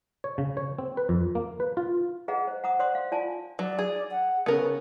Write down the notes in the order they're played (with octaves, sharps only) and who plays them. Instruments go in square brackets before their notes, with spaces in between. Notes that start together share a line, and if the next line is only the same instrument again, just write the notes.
[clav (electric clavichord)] C#5
C#3
C#5
C4
B4
F2
A#3
B4
F4
[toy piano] G#4 B4 D#5 F5 F#5 A#5
C5
F#5 A#5 D#6
C5 D5 F#5 C6 D#6
F5
F4 D5 F5 G#5 A5
[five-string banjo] F#3 [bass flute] D5
[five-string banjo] G#4
[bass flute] F#5
[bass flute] C#3 [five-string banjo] B3 A#4